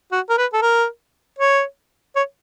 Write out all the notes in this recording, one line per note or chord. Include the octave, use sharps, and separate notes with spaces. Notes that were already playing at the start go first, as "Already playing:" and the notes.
F#4
A#4
B4
A4
A#4
C#5
C#5